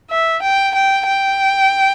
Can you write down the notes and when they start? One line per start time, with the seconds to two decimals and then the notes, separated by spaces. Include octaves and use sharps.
0.11 E5
0.43 G5
0.75 G5
1.07 G5